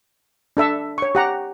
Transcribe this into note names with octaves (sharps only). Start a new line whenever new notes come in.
D4 A4 E5 A5
C#5 C#6
G4 F#5 A#5